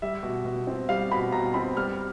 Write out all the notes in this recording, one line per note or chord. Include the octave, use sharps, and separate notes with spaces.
G3 E5
B2
B2
C4
G3 F5
B2 B5
B2 A#5
C4 B5
G3 F6